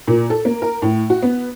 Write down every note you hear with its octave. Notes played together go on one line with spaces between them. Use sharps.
A#2
A4
A#3
A#4
A2
F#4
B3